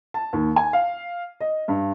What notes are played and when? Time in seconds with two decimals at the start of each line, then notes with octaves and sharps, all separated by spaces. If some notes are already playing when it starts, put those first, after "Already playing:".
0.14 A5
0.33 D#2
0.56 G#5
0.73 F5
1.41 D#5
1.68 G2